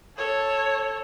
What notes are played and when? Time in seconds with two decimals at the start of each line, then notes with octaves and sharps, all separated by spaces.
0.17 A4 C#5